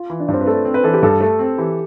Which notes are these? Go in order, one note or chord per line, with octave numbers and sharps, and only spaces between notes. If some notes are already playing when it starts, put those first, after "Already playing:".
Already playing: F4
E3
D4
G2
C4
B4
A3 A4
C4
B4
E3 A4
G4
G2 A4
A3
C4
E3 G4